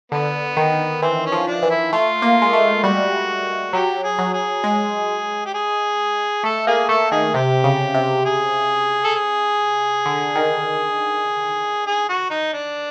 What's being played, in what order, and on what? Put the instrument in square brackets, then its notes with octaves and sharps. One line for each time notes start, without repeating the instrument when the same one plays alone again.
[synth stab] D3 [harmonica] B3
[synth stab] D#3
[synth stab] E3 [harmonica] C4
[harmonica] C#4
[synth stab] F3
[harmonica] D4
[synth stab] E3
[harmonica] E4
[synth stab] A3 [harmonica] F4
[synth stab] A#3
G#3
A3
[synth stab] G3 [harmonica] F#4
[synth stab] F#3 [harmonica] G4
[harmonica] G#4
[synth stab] F#3
[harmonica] G#4
[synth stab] G#3
[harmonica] G4
G#4
[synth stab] A3 [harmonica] A4
[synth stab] A#3 [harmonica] G#4
[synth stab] A3 [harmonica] A4
[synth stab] D#3 [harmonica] G#4
[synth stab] C3 [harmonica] G4
[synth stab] C#3
C3
[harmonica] G#4
A4
G#4
[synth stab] D3
D#3
[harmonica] G#4
F#4
D#4
D4